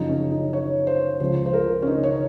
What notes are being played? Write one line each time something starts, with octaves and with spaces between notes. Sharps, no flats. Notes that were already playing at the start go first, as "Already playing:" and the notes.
Already playing: F#2 C#3 F3 D#4
C#4
D#4
C#5
C5
C#2 C#3 F3 C5
C5
A#4
C#4
D#4
C#5